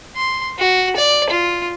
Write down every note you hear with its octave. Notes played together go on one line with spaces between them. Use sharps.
C6
F#4
D5
F4